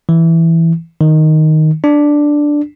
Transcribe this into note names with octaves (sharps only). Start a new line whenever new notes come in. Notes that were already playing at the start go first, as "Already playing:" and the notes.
E3
D#3
D4